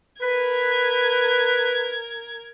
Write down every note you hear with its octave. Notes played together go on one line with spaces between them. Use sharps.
A#4 B4 G#6